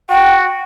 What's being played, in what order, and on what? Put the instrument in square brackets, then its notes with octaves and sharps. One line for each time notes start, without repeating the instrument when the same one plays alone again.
[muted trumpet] F#4 [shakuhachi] G5